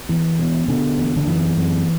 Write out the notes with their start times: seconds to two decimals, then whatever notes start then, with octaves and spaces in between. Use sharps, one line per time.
0.09 E2 E3
0.39 B2
0.68 B2 D3
0.98 E2
1.17 D3
1.27 F#2 E3
1.57 F#2